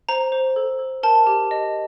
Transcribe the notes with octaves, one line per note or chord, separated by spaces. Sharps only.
C5 A#5
C5
A4
A4
A#4 A5
G4
D#5